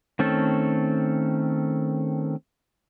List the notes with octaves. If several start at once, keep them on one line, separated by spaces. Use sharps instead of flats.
D#3 A3 C4 C#4 A4